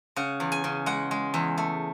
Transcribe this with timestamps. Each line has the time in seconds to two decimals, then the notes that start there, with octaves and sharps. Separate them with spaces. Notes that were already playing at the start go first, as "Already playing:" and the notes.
0.16 C#3 F#5
0.40 E2
0.52 G#5
0.64 C#3
0.86 G#3 F#5
1.11 G#3
1.34 E2
1.58 A3